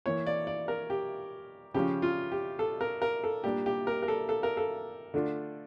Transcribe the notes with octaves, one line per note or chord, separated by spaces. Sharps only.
E3 A#3 E4 C#5
D5
D5
A#4
G4
C#3 F3 C#4 G4
F4
G4
A4
A#4
A#4
A4
A#2 G3 D4 G4
G4
A#4
A#4
A4
A4
A#4
A4
D3 A3 D4 F4